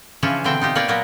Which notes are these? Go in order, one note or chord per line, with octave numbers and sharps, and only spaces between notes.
C#3 E3 F3 C#4 D4
B2 D3 E3 C4 G5
D#4 F4 G4
A#3 B4 C#5 D5 F5 G5
A#2 F#3 A#3 B3